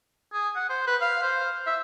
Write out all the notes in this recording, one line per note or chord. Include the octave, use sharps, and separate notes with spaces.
G#4
F#5
C5
B4
F5
C5
E5